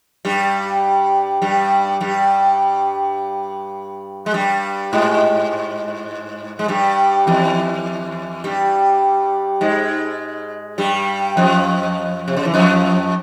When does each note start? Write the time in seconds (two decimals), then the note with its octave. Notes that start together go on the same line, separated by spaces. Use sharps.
0.25 G2 G3
1.42 G2 G3
2.00 G2 G3
4.26 G#3
4.34 G2 G3
4.93 G#2 G#3
6.59 G#3
6.68 G2 G3
7.27 E2 E3
8.44 G2 G3
9.61 G#2 G#3
10.78 G2 G3
11.37 F2 F3
12.28 C3
12.36 C#3
12.45 E3
12.54 F2 F3